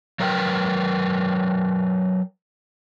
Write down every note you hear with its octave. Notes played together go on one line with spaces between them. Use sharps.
F#3 A#4 B4 F5 G5